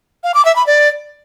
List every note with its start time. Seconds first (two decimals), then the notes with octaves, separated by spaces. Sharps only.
0.24 F5
0.34 D6
0.45 E5
0.56 B5
0.67 D5